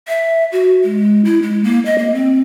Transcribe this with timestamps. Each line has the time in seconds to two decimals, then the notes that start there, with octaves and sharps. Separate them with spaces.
0.08 E5
0.52 F#4
0.84 G#3
1.25 E4
1.42 G#3
1.64 A#3
1.86 D#5
1.98 A#3
2.14 C4